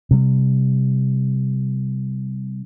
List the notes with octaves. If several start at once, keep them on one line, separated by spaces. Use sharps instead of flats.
C3 G3